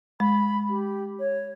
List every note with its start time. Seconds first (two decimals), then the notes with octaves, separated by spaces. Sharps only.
0.20 G#3 B5
0.69 G4
1.19 C#5